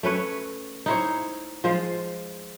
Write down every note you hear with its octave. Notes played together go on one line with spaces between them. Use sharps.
A3 C#4 B4 C#5
D#4 E4 C5 C#5
F3 G#3 F4 C5